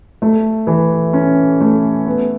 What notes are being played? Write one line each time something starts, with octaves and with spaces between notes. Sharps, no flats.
A3
E3
C#4
A3
B3